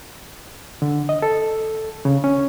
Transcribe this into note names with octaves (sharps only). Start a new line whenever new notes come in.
D3
D#5
A4
C#3
C#4